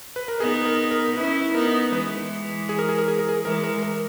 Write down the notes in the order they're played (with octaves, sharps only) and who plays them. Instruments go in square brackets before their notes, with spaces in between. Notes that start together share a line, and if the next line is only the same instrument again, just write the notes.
[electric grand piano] B4
A#4
[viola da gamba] B3 D#4 [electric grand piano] G#4
[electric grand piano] A#4
A#4
[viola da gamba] C#4 E4 [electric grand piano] B4
[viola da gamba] B3 D#4 [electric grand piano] A#4
[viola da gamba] E3 G#3 [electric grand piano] B4
[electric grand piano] G#4
A#4
G#4
A#4
G#4
A#4
G#4
[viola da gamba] E3 G#3 [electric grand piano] A#4
[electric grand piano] A#4
A#4